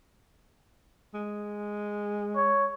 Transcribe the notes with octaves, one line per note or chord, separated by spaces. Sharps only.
G#3
C#5